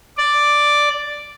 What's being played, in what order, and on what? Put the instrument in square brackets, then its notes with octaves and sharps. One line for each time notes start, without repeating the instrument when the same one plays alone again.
[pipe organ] D5